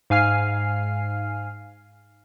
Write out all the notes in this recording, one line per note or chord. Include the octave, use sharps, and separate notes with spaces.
G#2 F5 G#5 F6 C7